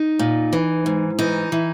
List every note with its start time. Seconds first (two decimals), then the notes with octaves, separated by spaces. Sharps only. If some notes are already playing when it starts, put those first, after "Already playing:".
Already playing: D#4
0.19 A#2
0.53 E3
0.86 G#2
1.19 E3 D#4
1.52 E3